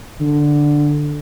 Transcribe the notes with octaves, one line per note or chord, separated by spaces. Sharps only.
D3